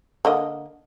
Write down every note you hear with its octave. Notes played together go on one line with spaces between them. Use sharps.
D3 A#3 D#5